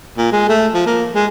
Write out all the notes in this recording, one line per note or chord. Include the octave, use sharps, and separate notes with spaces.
A#2
G#3
A3
F3
A#3
G#3